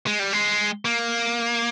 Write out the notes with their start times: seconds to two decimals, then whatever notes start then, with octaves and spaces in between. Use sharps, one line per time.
0.07 G#3
0.19 G3
0.33 G#3
0.85 A#3